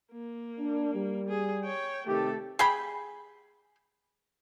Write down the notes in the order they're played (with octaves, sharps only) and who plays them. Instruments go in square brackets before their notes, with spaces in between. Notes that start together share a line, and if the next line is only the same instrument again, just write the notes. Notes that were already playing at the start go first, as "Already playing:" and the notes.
[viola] A#3
[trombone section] D4
G3
[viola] G#4
C#5 G5
[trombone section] C3 D#3 G4 [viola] A3 A4
[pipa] G#4 G5 B5